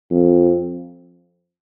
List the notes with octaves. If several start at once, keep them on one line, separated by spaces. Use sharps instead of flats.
F2